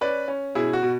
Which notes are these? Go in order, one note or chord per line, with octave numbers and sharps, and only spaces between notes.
C#4 B4 D5
C#4
B2 E4 G#4
F#4
B2